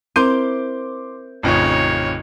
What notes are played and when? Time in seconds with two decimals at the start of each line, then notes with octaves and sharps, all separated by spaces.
0.16 C4 E4 A#4 C5 C6 D6 G6
1.43 A1 F2 C#3 D#4 C#5